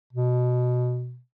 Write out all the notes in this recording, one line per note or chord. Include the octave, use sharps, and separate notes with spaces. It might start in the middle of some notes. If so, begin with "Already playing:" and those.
B2